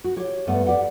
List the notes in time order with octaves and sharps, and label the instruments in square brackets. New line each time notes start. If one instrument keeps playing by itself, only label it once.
[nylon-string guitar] F#4
G4 C#5
G2 G3 A3 B3 F#5
G4 D5 F#5